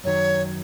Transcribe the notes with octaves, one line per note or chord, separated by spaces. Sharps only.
F#2 D#3 F#3 C#5